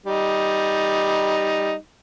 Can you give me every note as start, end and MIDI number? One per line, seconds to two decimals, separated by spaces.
0.06 1.73 55
0.06 1.73 63